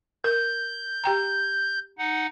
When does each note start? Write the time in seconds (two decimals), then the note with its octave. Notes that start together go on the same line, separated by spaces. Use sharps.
0.24 A#4 G6
1.04 G4 G5 A#5
1.98 D#4 F#5